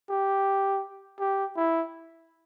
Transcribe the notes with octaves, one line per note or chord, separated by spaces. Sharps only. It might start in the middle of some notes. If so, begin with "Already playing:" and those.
G4
G4
E4